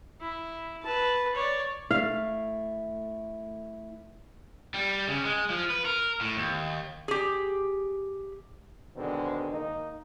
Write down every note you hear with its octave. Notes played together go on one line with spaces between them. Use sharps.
E4
B4 A5
C#5 D5
A3 E4 F5
G3
C#3
G#3
F3
B4
A#4
A2
D#2
G4 G#4
B2 D3 D#3 G#3 C4
D#3 A#3 D#4